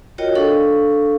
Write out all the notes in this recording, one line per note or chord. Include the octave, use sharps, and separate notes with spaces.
F4 F#4 A#4 C#5 D#5 G5
D4 A4 F5 C#6